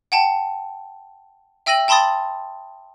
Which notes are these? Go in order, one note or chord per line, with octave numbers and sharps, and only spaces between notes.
F#5 G5 A5
E5 G5 E6 A#6 D#7 F#7
G5 A5 B5 C6 D#6 A6